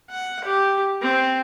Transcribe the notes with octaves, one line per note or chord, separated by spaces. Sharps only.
F#5
G4
C4